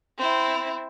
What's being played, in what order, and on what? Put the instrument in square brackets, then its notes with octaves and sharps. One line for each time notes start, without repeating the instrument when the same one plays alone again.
[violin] C4 E4